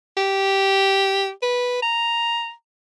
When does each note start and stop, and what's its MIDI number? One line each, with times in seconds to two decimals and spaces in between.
0.17 1.30 67
1.42 1.82 71
1.82 2.52 82